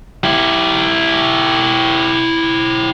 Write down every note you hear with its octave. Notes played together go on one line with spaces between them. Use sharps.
E4 G4